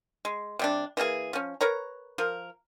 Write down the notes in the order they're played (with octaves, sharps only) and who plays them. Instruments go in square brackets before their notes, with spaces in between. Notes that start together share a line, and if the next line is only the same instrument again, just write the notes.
[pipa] G#3
C3 G3 D4
E3 A#3 D#4 G#4
F3 C#4
A#4 B4 C#5 A#5
F3 A#4